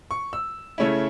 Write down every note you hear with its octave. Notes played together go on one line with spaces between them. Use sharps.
C#6
E6
C#3 A3 C#4 E4